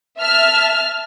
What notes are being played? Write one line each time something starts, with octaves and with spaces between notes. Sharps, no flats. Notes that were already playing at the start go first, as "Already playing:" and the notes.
E5 A5 F6